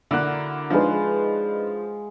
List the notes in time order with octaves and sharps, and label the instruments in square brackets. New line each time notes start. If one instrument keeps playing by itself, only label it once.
[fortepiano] D3 A#3 F#6 [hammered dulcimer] E4 F#4
[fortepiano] F3 [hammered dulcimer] G#3 F5 [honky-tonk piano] D4 D#4 B4